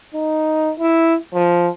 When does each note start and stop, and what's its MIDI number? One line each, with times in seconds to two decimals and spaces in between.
0.14 0.73 63
0.79 1.16 64
1.34 1.69 53